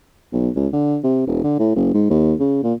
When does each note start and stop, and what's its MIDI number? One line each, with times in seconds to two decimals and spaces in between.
0.33 0.50 35
0.56 0.68 37
0.73 0.98 50
1.03 1.25 48
1.27 1.40 28
1.44 1.59 50
1.59 1.75 45
1.76 1.92 30
1.94 2.06 44
2.10 2.34 39
2.40 2.59 49
2.64 2.74 46